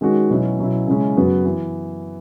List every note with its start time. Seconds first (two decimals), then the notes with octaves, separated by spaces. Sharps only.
0.01 D#3 G#3 C#4 F#4
0.30 B2 F#3 C#4 E4
0.59 B2 F#3 C#4 E4
0.87 C#3 G#3 C#4 E4
1.16 F#2 C#3 F#3 B3 F#4
1.45 E3 B3